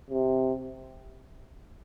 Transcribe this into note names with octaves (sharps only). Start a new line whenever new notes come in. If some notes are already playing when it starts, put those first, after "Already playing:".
C3